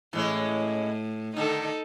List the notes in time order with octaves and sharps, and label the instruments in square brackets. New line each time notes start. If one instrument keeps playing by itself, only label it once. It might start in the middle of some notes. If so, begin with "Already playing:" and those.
[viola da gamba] A2 [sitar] E3 G#3 C#4
[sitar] D3 D#3 [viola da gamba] D#4 A4